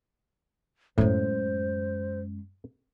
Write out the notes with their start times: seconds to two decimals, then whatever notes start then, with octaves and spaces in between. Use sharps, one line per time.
0.98 F#2 A2 G#3 C5